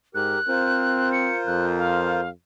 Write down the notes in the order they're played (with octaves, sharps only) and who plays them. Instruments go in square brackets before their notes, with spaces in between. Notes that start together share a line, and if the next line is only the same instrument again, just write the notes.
[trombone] G#2 [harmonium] G4 A#4 [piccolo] F#6
[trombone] C4 [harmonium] F4 A#4 C5
[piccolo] C#7
[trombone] F2 [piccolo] F#6
[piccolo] F5